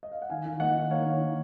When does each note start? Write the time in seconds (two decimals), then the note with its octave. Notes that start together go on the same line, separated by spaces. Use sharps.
0.03 D#5
0.11 F5
0.22 F#5
0.30 D#3 F5 G#5
0.45 D#3
0.60 A#3 D#5 F#5
0.75 D#3
0.90 A#3 C#5 F5
1.06 D#3
1.20 D#3